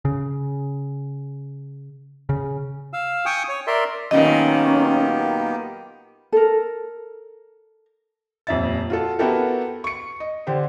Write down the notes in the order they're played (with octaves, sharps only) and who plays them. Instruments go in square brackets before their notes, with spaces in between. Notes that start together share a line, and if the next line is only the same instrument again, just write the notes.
[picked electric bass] C#3
C#3
[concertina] F5 E6
G5 G#5 C#6 D#6
C#5
A#4 D5 E5 C6
[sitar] F#2 A#2 D#3 [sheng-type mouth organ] A#3 B3 G4 [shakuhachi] C#4 [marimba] D#5
[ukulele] A4 A#4
[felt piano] D#1 F2 E5 A6
F4 F#4 A4
B3 E4 F#4 G4 A4 A#4
C#6 C#7
D#5
D3 G4 C5